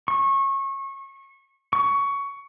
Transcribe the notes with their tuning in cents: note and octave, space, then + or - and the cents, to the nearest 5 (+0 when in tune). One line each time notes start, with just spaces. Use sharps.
C#6 -25
C#6 +15